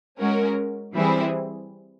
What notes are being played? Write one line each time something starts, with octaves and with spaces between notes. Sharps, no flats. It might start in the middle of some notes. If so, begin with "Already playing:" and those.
G#3 C#4 F#4 A#4
E3 G3 C4 E4 G#4